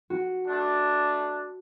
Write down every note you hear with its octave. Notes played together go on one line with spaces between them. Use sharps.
F#4
A3 D4